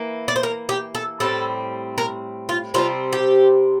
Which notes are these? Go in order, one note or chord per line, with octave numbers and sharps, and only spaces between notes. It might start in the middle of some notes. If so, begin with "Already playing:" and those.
Already playing: E3 A#3
D5
C5
A#4
G4
A4
A2 G3 C4 A4
A#4
F4
C3 G3 C4 F4
G4